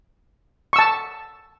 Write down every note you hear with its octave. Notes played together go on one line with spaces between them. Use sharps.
A5 C#6 E6